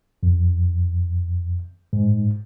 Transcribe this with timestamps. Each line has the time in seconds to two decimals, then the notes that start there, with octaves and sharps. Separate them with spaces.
0.23 F2
1.93 G#2